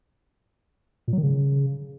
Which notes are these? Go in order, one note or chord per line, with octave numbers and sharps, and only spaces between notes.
A#2
F#3
D#3
C#3